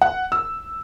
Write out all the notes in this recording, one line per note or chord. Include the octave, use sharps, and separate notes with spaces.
F#5
E6